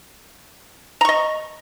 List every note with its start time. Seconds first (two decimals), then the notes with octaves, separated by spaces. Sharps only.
1.01 A#5
1.05 C#6
1.09 D#5